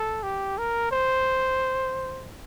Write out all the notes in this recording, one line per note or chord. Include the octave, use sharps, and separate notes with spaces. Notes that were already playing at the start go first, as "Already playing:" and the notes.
Already playing: A4
G4
A#4
C5